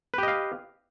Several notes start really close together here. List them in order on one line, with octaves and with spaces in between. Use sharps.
B4 G4 D#5 F5